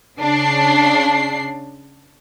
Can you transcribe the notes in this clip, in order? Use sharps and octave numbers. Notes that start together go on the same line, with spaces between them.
C#3 D4 C7